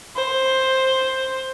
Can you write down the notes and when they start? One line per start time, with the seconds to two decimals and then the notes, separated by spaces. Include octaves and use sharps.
0.16 C5